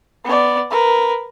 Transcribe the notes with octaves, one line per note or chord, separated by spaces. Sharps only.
B3 D5
A#4 B4